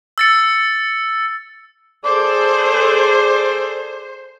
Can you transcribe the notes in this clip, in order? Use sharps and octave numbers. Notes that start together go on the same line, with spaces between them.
E6 A6 C#7
G#4 A4 C5 D5